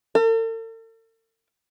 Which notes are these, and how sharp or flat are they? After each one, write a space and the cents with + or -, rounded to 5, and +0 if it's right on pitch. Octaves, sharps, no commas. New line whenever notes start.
A4 +45